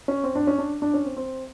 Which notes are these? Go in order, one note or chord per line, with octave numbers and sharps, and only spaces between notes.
C#4
C4
D4
C#4
D4
D4
C#4
C4
C4